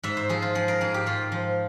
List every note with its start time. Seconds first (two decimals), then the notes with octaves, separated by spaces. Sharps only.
0.03 G#2 E5
0.17 C5
0.29 F3 G#4
0.42 F4
0.55 F3 G#4
0.68 A#4
0.81 G#2 G#4
0.94 G4
1.06 G#2 F4
1.32 F3